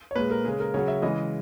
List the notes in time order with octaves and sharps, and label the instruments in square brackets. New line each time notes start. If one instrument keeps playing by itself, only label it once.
[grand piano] C#5
A#2 G#3 B4
A#4
C#3 G#3 G#4
A#4
C#3 F#3 C#5
E5
C#3 E3 G#3 D#5